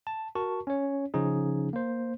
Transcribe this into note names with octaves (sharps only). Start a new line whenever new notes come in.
A5
F#4 A#4 A5 C#6
C#4 C#5
C#3 F3 C#4 D#4 G#4
A#3 C5